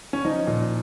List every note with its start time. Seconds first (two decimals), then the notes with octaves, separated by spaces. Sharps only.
0.13 C#4
0.25 F3 D#4
0.47 A#2